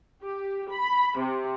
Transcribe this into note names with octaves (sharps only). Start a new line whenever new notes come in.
G4
B5
C3